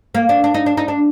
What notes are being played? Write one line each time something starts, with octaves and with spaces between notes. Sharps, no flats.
A#3
D4
D4
D#4
D4
D#4
D4